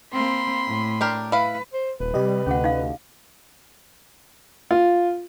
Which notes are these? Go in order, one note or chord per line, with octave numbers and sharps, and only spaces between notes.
A#3 C4 B5 C6
A2
D4 G4 A#4
E4 B4 F5
C5
D#1 B4
C3 G3 G4 D#5
D2 C#4 G#4 F#5
D#4 F5
F4